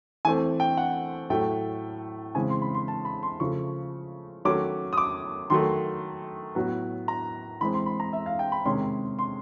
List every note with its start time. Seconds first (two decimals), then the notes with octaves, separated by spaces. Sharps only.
0.25 E3 A3 C4 G#5
0.60 G5
0.77 F#5
1.30 A2 F#3 A3 G5
2.35 C#3 E3 G#3 C4 G#5
2.50 C6
2.62 B5
2.75 C6
2.88 A5
3.05 B5
3.23 C6
3.40 C#3 F3 A3 C#6
4.45 D#3 F#3 A3 C#4 D6
4.93 D#6
4.98 D6
5.50 D#3 F#3 A3 C6
6.55 A2 F#3 B3
7.08 A#5
7.61 E3 G#3 C4 B5
7.74 C6
7.86 B5
8.00 A#5
8.13 E5
8.26 F5
8.39 G5
8.52 B5
8.65 C3 D#3 G#3 C#4 C6
9.19 C6